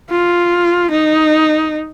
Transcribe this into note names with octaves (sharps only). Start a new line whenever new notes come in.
F4
D#4